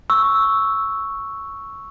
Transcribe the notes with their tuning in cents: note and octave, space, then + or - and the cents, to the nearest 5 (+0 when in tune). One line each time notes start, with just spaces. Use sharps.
C#6 +0 E6 +0